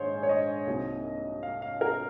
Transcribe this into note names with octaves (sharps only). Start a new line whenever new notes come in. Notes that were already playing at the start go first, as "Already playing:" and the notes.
Already playing: A#1 G#2 D#3 C5 C#5
C#5
D#5
C2 C3 F#3 A#3 D#4
F5
F5
A#4